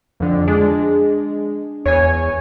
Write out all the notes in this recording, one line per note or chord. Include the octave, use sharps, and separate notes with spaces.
F2 D3
G#3 D4
E2 C#5 G#5